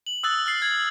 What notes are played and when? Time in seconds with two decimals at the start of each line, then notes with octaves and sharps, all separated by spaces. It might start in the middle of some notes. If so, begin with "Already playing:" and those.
0.07 F#7
0.23 D#6 E6 F#6 A6
0.46 F6 A6 C7
0.62 G#6